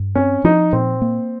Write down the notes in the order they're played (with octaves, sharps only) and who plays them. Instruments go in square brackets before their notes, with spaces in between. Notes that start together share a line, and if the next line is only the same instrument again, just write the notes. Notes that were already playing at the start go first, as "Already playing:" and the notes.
Already playing: [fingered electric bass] G2
[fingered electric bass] C4 [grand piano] C#4
[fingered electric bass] F3 [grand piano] D#4
[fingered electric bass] A#2 [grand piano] C4
[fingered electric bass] A#3